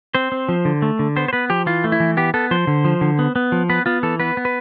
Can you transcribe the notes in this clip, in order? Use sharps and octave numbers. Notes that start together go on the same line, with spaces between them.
C4 C5
C4
F3
D3
A3
D3
B3 C5
C5
B3 B4
F3 G4
E3 F4
A3
E4
E3
B3 G4
B3 A4
F3 C5
D3
F3
D3
B3
B3
F3
B3 B4
B3 F4
E3 A4
B3 B4
B3
B4